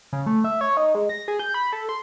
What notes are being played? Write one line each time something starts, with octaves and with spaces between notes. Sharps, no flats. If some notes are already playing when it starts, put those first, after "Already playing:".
C#3
A3
E5
C#5
D#4
G#3
A#6
G#4
G6
B5
A4
C6